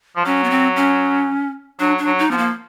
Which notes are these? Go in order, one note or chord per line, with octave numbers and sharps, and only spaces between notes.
F3
F#3 C#4
B3
C4
C#4
F#3 D4
D4
F#3
D#4
F3 B3
A#3